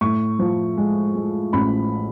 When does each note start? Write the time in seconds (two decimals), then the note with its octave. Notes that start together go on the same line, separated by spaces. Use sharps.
0.01 A2 C#6
0.39 F3
0.77 G#3
1.15 G#3
1.53 A1 B5